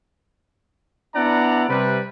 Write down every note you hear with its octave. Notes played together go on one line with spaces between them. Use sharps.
B3 D4 E4 D5 F#5 A#5
C3 G3 B4